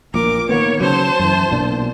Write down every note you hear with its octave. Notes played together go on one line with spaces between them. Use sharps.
A#1 A#2 A#4 D6
D#3 A#3 B3 C#5
C#3 F#3 C5 A5
F#2 E3
B1 A#2 D4